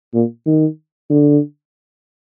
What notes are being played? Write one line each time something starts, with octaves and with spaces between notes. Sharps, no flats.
A#2
D#3
D3